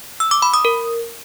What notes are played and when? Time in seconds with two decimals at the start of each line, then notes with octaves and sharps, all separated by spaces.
0.20 E6
0.31 D6
0.42 B5
0.54 D#6
0.65 A#4